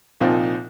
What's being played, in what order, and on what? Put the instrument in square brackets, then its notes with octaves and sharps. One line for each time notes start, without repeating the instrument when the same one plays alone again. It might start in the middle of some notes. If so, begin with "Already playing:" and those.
[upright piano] C2 A#2 F3 C4 D#4